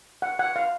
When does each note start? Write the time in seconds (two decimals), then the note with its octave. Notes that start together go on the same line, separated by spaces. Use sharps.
0.22 F#5
0.39 F#5
0.56 F5